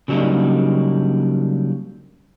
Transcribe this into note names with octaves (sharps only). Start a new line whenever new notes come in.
C#3 F#3 G3 A#3 D4 D#4